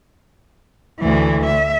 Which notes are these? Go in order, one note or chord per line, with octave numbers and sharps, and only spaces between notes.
D2 E3
E5